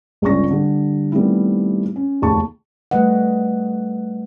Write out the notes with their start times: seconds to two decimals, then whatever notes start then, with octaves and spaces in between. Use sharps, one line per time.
0.22 G1 C#2 C#4 D5 C#6 A#6
0.51 D3 G3
1.12 D#3 G3 A3 B3 C4 E4
1.96 C#4
2.22 F1 D#2 G#4 A5 C#6
2.91 G3 A3 B4 D#5 F#5